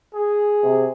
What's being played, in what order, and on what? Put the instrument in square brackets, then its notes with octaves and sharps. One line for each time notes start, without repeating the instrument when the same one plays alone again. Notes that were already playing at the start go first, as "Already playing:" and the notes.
[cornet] G#4
[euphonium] C3